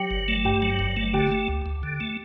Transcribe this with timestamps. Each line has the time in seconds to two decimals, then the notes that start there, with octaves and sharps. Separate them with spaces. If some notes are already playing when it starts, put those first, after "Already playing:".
Already playing: F#3 G4 G5
0.11 G1
0.28 A3
0.45 G2 G4 G5
0.62 F#3
0.79 G1
0.97 A3
1.13 D3 G4 G5
1.31 A3
1.48 D2
1.66 D2
1.83 D3
2.00 A3